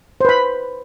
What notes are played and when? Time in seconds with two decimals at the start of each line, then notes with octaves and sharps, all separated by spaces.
0.21 C5
0.25 B4
0.29 B5